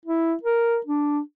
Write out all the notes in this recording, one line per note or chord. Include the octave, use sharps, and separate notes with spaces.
E4
A#4
D4